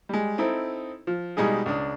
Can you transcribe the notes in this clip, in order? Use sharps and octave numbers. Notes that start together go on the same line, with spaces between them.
G3 G#3
C4 D#4 E4 A4
F3
B2 G3 G#3 D#4 G#4
C#2 D4 D#6